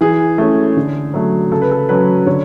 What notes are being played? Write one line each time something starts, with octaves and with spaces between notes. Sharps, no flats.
E3 G#4
A3 C#4 G#4
D3
F#3 A3
C#3 A4
B4
A4
F#3 C#4 B4
D3 C#5